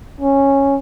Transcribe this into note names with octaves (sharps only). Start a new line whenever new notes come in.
C#4